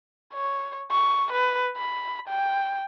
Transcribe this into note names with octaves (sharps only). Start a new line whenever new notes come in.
C#5
C#6
B4
B5
G5